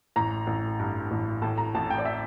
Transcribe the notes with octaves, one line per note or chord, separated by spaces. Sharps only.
A1 A#5
A1
G2
A1
A2 A5
A#5
A1 A5
G5
D5
E5